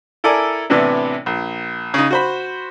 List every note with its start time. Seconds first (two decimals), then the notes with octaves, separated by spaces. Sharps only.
0.24 E4 A4 A#4 D5 G#5
0.70 A2 C3 E3 B3 D4
1.26 A#1
1.94 C#3 D#4
2.11 F#4 C5 B5